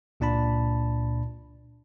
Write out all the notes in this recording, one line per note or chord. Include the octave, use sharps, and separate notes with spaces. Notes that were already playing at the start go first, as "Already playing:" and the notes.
C#2 A#2 D4 A5 B5